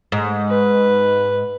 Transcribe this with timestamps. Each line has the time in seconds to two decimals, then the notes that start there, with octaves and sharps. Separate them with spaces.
0.12 G#2
0.49 B4